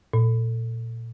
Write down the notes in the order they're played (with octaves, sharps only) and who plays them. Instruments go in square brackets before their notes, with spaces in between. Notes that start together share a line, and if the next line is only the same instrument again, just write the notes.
[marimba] A#2